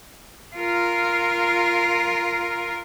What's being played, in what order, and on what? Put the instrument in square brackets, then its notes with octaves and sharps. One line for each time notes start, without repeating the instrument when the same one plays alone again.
[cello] F4 A#4